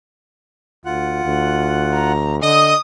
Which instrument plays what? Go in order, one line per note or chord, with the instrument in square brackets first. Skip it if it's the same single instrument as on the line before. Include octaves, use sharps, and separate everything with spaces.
[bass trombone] D2 [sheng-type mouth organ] F4 F#5 F#6
[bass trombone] D2
[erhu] A#5
[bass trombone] D3 [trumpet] D#5 [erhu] D#6